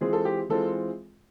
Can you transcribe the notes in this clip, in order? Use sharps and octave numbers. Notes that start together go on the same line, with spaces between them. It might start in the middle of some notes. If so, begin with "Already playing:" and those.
E3 G#3 C4 F4 G#4
A4
G4
E3 G#3 C4 F4 A4